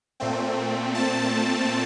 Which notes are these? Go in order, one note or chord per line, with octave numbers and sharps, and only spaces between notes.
A#2 A3 C4
A5